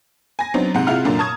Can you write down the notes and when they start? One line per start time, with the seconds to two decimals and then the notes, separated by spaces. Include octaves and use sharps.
0.39 G#5 A#6
0.54 F#3 B3 C4 D4 D#4
0.74 G#2 C3 F#5
0.87 C3 G#3 E4 F4 F#5 F6
1.05 F#2 A#2 D3 D4
1.19 A5 A#5 C#6 D#6 G#6